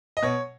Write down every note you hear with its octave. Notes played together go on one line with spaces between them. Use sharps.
D#5
B2 C#5